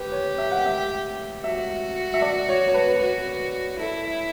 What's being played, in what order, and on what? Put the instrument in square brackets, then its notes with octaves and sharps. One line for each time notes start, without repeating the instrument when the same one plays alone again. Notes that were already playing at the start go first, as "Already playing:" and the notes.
Already playing: [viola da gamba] G4 [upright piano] B4
[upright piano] C#5
E5
F#5
E5
[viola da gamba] F#4 [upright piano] E5
[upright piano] E5
D5
C#5
C#5
B4
[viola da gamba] F#4
[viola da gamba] E4 [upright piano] A4